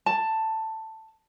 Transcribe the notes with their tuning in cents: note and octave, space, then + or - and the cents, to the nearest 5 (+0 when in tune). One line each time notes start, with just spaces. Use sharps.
A5 +10